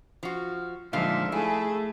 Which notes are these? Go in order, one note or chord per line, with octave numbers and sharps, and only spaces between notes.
F3 F#4
A#2 D3 F3 G#3 D#4 E5 F5
A3 E4 G#4